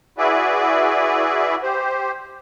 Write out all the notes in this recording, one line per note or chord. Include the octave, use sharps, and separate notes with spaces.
E4 F#4 G#4 B4 D5 E5
G4 C5